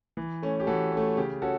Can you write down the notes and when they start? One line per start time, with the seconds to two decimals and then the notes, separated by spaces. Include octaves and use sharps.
0.17 E3
0.42 A3 C#4
0.60 G4
0.67 E3 F#4 A4
0.92 C#4
0.97 A3
1.17 C#3 G4
1.42 C#4 F#4 A4